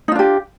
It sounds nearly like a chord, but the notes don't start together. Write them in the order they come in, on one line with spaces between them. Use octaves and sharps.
D#4 F4 D4 G4